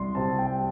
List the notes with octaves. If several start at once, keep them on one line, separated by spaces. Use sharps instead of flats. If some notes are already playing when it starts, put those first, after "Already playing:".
Already playing: C2 C6
C3 G3 C4 A5
G5